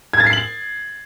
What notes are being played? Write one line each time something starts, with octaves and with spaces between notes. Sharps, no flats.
G#6
A6
C7
F#7